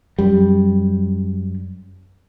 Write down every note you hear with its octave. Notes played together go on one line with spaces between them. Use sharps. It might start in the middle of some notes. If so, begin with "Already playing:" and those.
F#2 G3